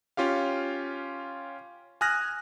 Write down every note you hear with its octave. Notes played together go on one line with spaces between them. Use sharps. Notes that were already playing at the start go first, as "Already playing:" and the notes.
C#4 F4 G4 F5
G#5 D#6 F6 F#6 A#6